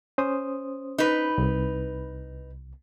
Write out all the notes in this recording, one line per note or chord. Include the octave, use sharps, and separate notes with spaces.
C#4 C5 D#6
D#4 B4
C2